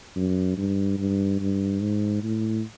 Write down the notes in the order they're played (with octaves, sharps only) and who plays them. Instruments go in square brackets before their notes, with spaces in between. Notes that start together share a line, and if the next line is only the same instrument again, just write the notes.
[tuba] F#2
G2
G2
G2
G#2
A2